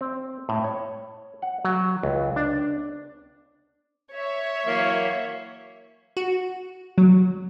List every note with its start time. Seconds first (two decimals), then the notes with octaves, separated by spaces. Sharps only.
0.01 C4
0.49 A2
0.64 C#5
1.42 F#5
1.65 F#3
2.03 C#2
2.36 D4
4.12 C#5 E5
4.65 E3 F#3 A#3
6.17 F#4
6.98 F#3